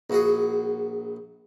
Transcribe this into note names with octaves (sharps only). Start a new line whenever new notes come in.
A#1 F#4 G#4